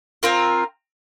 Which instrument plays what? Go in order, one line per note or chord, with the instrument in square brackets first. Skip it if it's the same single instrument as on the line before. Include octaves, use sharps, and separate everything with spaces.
[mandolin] C4 F4 A#4